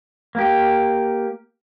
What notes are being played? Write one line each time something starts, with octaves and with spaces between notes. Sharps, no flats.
A#3 G4